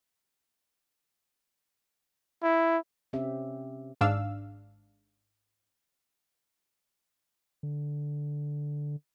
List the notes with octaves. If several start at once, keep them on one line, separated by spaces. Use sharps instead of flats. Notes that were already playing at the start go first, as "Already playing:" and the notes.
E4
C3 C4 C#4 G4 E5
G#1 G#2 D4 F5 E6
D3